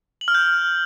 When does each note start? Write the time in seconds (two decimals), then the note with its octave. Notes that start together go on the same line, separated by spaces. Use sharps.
0.21 F#7
0.28 F6
0.35 G6